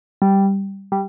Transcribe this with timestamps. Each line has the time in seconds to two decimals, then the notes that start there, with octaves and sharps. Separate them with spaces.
0.22 G3
0.92 G3